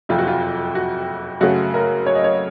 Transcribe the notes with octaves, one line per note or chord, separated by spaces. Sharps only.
F#1 F2 C3 F4
F#4
F4
F#4
F#2 C#3 A3 F#4
A#4
C#5
D#5
C#5